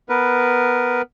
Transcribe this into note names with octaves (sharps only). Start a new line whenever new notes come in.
B3 A#4 B4